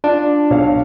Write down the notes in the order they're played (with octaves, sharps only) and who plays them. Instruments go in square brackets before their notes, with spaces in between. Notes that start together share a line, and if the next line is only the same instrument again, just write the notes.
[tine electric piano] D4 [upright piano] F4
[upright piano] B1 C#5 F5